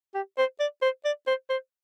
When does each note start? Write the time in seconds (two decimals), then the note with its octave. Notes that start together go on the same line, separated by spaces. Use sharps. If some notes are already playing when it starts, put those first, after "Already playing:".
0.14 G4
0.38 C5
0.60 D5
0.82 C5
1.05 D5
1.27 C5
1.50 C5